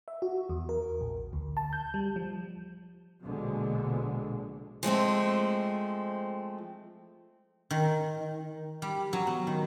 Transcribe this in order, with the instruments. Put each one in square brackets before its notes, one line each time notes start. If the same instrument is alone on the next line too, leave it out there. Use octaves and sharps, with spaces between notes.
[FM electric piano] E5
F#4
E2
A#4
A#1
D2
A5
G6
G3
F3
[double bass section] A#1 B2 D3 G#3
[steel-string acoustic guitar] F3 G#3 A3 C4
[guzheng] D#3
G3
F#3
B3
D#3